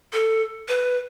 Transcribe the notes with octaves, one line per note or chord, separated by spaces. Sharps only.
A4
B4